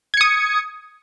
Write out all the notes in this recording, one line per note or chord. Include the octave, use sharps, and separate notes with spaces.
D#6 G#6 C#7